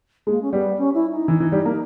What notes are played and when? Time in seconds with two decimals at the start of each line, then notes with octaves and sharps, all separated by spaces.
0.27 G#3 A#3
0.41 C#4
0.52 G3 B3
0.78 C#4
0.94 E4
1.11 D#4
1.28 E3
1.40 E3
1.52 G3
1.65 A#3